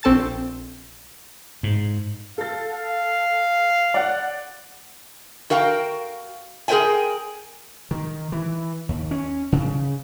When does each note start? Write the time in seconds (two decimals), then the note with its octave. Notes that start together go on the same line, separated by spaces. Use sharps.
0.03 A#1 C4 A4 A5 A6
1.63 G#2
2.38 A4 F5 A6
2.72 F5
3.94 D5 F#5
5.50 F#4 A#4 F5 G5
6.68 G#4 A#4 C5 D#5 G5 G#5
7.91 D#3
8.32 E3
8.89 D#2
9.11 C#4
9.52 C#3